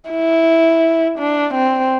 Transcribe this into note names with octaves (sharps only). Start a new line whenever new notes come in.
E4
D4
C4